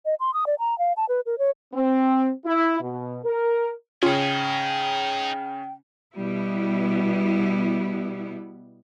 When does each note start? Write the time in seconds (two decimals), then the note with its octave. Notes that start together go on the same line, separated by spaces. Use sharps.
0.05 D#5
0.20 C6
0.34 D#6
0.47 D5
0.59 A#5
0.79 F5
0.97 A5
1.09 B4
1.26 A#4
1.39 C#5
1.74 C4
2.46 E4
2.80 B2
3.24 A#4
4.03 C#3 C#4 D#4 F4 G#4 G5
6.17 B2 G3 B3 E4